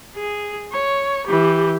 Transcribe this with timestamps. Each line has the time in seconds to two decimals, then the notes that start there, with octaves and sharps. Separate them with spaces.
0.16 G#4
0.72 C#5
1.26 E3 G4